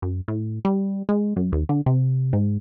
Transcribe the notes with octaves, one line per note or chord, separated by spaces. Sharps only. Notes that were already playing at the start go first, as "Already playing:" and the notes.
F#2
A2
G3
G#3
F#2
D#2
D3
C3
G#2